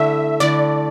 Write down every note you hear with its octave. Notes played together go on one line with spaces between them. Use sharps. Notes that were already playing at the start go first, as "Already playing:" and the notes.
Already playing: D3 A3 E4 E5
D3 A3 E4 D5